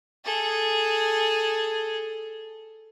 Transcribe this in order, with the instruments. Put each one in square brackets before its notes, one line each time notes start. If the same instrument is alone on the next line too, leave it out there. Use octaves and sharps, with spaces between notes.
[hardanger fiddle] G#4 A4